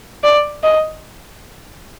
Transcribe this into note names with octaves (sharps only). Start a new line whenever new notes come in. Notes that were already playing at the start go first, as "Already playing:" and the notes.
D5
D#5